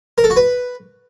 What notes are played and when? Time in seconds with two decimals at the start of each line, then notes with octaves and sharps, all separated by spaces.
0.18 A#4
0.24 A4
0.30 F#4
0.36 B4